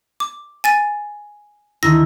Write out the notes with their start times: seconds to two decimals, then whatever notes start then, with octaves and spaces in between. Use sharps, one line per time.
0.20 D6
0.64 G#5 A6 D#7
1.83 D2 D#3 E4 A#6